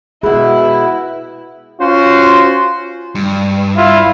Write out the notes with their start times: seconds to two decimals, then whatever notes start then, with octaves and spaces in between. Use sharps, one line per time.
0.23 B2 E4 G#4 B4
1.80 C#4 F4 F#4 C5
3.15 G2
3.77 E4 F4